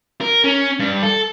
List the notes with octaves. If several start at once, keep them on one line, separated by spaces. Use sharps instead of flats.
A#4
C#4
G2
A4